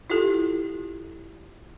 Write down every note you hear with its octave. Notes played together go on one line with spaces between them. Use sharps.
E4 F4 G4 A4